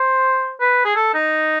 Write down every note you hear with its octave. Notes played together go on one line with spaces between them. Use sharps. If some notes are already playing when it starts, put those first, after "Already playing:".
Already playing: C5
B4
G#4
A4
D#4